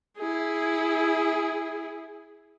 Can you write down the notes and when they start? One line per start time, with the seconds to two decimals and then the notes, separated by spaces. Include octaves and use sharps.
0.18 E4 G#4